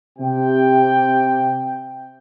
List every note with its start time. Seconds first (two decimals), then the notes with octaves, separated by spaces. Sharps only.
0.18 C3 G5